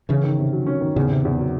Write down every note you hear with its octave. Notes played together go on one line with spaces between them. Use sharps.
C#3 E3 C#4
D#3
C3
F#3
C#4
D#3
E2 A2 C#3
C3
E2
F#3